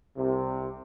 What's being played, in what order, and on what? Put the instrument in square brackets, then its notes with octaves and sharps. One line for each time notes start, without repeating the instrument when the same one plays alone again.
[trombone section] C2 C3